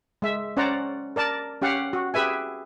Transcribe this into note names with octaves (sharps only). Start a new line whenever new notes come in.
G#3 E5
C#4 C5 D5 F#5 A#5
A#4 D5 A5
C#4 G4 F5 F#5
F#4
G4 G#4 B4 E5 G#5